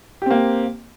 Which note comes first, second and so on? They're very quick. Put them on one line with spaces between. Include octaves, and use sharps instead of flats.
G4 C4 A#3